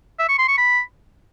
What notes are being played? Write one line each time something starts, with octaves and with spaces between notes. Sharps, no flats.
E5
C#6
C6
C#6
B5